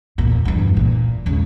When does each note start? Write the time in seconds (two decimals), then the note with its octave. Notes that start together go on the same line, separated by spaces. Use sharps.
0.18 E2 A#2
0.45 E2 G2
0.77 A#2
1.26 E1 C#3